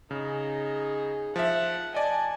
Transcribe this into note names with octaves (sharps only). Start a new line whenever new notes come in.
C#3 D#4 G#4
F3 E5 F#5
D5 D#5 G#5 A5